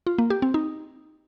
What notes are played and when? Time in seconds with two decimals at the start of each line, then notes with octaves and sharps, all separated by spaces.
0.07 F4
0.18 A#3
0.30 G4
0.42 C4
0.54 D#4